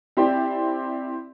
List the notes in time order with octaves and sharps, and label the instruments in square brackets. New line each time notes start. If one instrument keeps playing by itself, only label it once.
[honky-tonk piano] C4 E4 G4 C5 D5